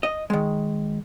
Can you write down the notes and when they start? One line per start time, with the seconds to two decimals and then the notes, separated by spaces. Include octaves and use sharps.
0.03 D#5
0.30 D#3 G#3